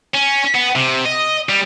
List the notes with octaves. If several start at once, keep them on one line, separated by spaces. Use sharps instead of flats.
C#4
B3
C3
D#5
G3